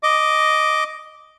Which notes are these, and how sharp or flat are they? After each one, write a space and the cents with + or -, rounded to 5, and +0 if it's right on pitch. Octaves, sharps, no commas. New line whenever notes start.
D#5 +0 D6 +0